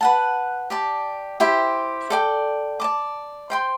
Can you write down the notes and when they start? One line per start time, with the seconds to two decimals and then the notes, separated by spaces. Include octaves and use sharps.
0.01 B4 F#5 A5
0.70 G4 D5 A5
1.40 E4 G4 C5 G5
2.10 A4 D5 G5
2.80 D5 A5 D6
3.50 C5 G5 C6